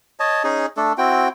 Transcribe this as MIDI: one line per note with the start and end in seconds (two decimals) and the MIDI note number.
0.20 0.43 73
0.20 0.43 75
0.20 0.43 81
0.44 0.66 61
0.44 0.66 63
0.44 0.66 68
0.77 0.93 57
0.77 0.93 62
0.77 0.93 69
0.98 1.28 60
0.98 1.28 64
0.98 1.28 66
0.98 1.28 79